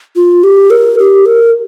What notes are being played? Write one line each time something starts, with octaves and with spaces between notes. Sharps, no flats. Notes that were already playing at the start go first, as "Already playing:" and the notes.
F4
G4
A#4
G4
A#4